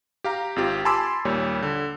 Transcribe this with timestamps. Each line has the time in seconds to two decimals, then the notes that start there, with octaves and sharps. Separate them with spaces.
0.24 G4 F5 A#5
0.56 G#1 C4 F4 G4
0.85 G#5 A5 B5 C6 D6 E6
1.25 D#2 A#2 G3 C#5
1.62 D3